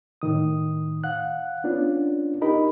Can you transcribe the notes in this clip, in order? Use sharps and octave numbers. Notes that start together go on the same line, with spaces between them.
A2 D#3 D#6
F5 F#5 F#6
B3 C#4 D4 F4
D#4 G4 A#4 D#5 B5